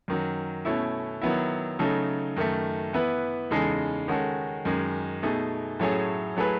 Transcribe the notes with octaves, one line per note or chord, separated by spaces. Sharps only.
F#2 D#3 F#3
B2 A3 C#4 E4
D#3 F#3 B3 E4
C#3 F#3 A3 D#4 A4
F#2 D#3 A3
E3 B3 E4 B4
E2 C#3 G#3 D#4 A4
D#3 G#3 C#4 F#4 A4
F#2 D#3 G#3
B2 A3 D#4 G#4
A2 F#3 A3 C#4 G#4
F#3 A3 E4 G#4 B4